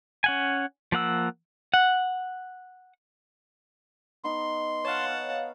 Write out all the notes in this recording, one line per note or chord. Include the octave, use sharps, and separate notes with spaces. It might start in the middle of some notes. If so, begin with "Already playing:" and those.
C#4 F#5 G#5
F3 A#3 F#5 E6
F#5
B3 D#4 C6
C#5 F5 F#5 A5